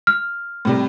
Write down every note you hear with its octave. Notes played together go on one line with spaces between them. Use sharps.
F6
A2 C3 G3